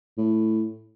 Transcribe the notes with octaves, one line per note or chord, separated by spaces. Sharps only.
A2